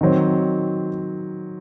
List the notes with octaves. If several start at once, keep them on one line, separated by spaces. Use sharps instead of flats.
D#3 F#3 C4